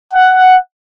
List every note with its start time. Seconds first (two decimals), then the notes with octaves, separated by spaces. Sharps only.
0.13 F#5